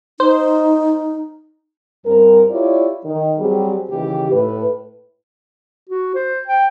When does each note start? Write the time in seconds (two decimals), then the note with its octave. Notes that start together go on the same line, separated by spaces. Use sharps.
0.20 D#4 C5
2.05 G2 G3 C4 A#4
2.50 E4 F4 G4 C#5 D5
3.04 D#3
3.38 F#3 G3 C4 G4 G#4
3.89 D#2 C#3 E3 G4
4.31 A2 B4
5.89 F#4
6.15 C5
6.48 G5